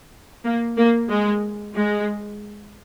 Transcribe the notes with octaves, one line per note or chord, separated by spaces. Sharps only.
A#3
A#3
G#3
G#3